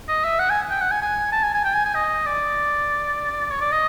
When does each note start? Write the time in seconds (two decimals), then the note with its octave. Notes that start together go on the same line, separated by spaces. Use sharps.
0.09 D#5
0.24 E5
0.39 F#5
0.50 G#5
0.71 G5
0.81 F#5
0.91 G#5
1.02 G#5
1.32 A5
1.43 G#5
1.54 G#5
1.64 G5
1.74 G#5
1.85 G#5
1.95 D#5
2.26 D5
3.51 C#5
3.61 D5
3.72 D#5